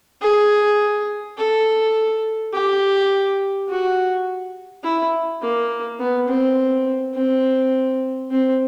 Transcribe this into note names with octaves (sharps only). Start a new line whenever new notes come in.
G#4
A4
G4
F#4
E4
A#3
B3
C4
C4
C4